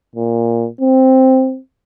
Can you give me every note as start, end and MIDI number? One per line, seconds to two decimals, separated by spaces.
0.15 0.68 46
0.81 1.59 60